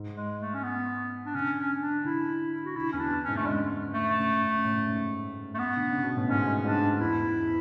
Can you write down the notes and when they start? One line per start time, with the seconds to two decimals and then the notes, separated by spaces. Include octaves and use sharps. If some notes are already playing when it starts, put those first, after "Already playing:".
Already playing: G#2
0.16 G#3
0.40 A3
0.54 C#4
0.63 B3
1.26 D4
1.34 D3 C#4
1.57 C#4
1.81 D4
2.04 D3 E4
2.65 F#4
2.76 D3 E4
2.92 E2 C#4
2.99 D4
3.11 F#2
3.23 G#2 C#4
3.36 D3 A3
3.47 C#3 G#3
3.94 A3
4.17 C#3
4.41 F#2
4.65 A2
4.88 G#2
5.54 A3
5.59 B3
5.77 D3
5.90 C#3
6.03 B2
6.17 A2
6.29 G#2 C#4
6.47 G#2
6.65 G#2 D4
6.83 F#2
7.01 E2 E4
7.36 E2